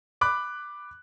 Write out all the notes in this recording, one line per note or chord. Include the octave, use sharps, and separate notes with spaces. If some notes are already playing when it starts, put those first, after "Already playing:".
B5 D6 F#6